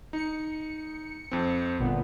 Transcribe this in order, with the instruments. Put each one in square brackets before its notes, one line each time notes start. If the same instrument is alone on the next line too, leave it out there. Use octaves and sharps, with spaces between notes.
[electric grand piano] D#4 [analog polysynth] C#7
[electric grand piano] F2 C4
[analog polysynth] G1 A#2 B3